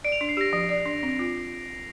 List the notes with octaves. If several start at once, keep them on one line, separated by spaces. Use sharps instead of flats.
D5 D7
F7
D4 D7
C7
G4 A#6
F3 A#6
D5
D4
C4
F4